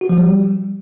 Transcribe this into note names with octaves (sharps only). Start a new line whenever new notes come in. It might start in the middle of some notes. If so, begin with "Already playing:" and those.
F#4
F3
G3